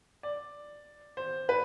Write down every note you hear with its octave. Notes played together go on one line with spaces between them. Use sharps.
D5
C5
B4